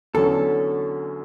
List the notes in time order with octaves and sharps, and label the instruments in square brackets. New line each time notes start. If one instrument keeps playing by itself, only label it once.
[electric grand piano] E2 D3 F#3 C#4 [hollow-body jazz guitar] A4